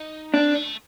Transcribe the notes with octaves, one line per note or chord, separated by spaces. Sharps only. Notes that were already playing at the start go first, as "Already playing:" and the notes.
Already playing: D#4
C4 D4
A3